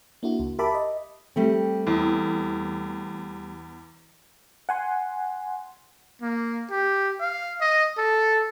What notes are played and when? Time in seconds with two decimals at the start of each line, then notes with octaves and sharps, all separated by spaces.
0.23 A#3 D4 E4 F#4
0.40 C#2
0.59 G4 A#4 E5 A5 B5 D6
0.75 D#5
1.36 G3 A3 C4
1.87 E2
4.69 F#5 G#5 C6
6.22 A#3
6.70 G4
7.20 F5
7.61 D#5
7.98 A4